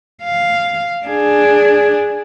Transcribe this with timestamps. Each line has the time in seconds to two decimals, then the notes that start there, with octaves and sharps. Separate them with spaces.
0.23 F5
1.06 D4 G#4